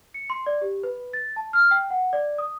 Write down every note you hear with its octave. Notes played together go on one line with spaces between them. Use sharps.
C#7
C6
D5
G4
B4
A6
A5
F6
G5
F#5
D5
D#6